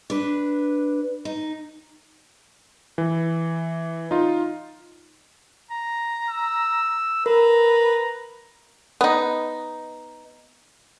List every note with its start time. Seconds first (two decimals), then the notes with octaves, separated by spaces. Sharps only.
0.10 D4 B4
1.25 D#4
2.98 E3
4.11 D#4 F4
5.71 A#5
6.30 E6
7.26 A#4 B4 A#5
9.01 B3 D#4